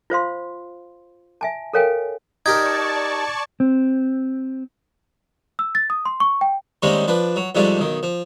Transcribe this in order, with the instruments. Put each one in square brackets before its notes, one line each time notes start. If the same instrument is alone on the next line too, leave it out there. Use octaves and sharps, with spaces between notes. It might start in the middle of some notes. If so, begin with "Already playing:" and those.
[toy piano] F4 C5 F5 C6
E5 G#5 A5
A4 A#4 C#5 F5 G5 G#5
[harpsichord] D#4 G4 A#4 [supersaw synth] D5 A5 C#6 [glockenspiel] G#6
[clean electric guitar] C4
[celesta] E6
A6
D#6
C6
C#6
G5
[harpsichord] D#3 G3 G#3 A#3 C4 C#4
F3 D4 B4
F#3
F2 G#2 F3 G3 A3 D4
B1 D#3
F3